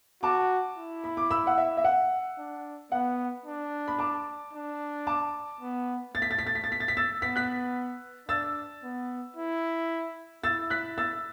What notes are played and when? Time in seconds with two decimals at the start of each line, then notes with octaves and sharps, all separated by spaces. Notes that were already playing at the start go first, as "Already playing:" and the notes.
0.23 F#4 A5 D6
0.77 E4
1.04 B5
1.17 D6
1.31 B5 E6
1.47 F#5
1.58 E5
1.77 E5
1.84 F#5
2.38 D4
2.92 B3 F#5
3.46 D4
3.88 B5
3.99 A5 D6
4.53 D4
5.07 A5 D6
5.61 B3
6.14 A3 A6
6.22 B6
6.31 A6
6.39 B6
6.47 A6
6.55 B6
6.64 A6
6.72 B6
6.80 A6
6.88 B6
6.97 E6 A6
7.21 B3 B6
7.36 F#6 B6
8.28 D4 E6 A6
8.83 B3
9.37 E4
10.44 E4 E6 A6
10.70 F#6 B6
10.98 E6 A6